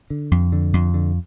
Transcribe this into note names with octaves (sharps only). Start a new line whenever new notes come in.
D3
F2
D3
F2
D3